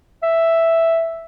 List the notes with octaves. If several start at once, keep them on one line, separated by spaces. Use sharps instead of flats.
E5